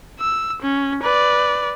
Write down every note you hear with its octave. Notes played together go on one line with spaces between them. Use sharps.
E6
C#4
B4 D5